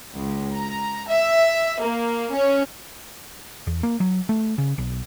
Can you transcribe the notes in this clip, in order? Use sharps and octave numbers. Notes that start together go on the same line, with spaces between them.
C#2
A#5
E5
A#3
C#4
E2
A#3
F#3
A3
C#3
B1